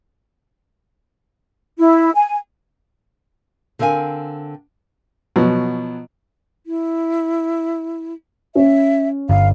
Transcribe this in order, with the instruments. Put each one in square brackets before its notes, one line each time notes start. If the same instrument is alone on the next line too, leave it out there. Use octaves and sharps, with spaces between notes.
[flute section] E4
G#5
[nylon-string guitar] D3 C4 A#4 F5 G#5
[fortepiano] B2 F3 F#3
[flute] E4
[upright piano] C#4 [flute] E5
[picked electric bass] G1 [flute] F5